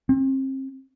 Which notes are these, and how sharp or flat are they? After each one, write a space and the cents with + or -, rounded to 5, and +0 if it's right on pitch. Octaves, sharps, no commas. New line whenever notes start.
C4 +35